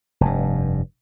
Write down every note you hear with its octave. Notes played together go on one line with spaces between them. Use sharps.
F1 G2